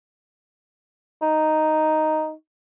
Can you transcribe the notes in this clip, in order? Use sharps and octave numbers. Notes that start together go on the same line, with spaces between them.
D#4